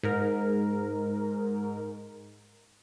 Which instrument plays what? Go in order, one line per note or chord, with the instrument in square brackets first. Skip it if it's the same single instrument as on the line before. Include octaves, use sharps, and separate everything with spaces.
[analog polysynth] G#2 A#4